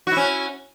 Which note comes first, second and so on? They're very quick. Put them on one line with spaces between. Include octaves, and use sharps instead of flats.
F#4 E4 C#4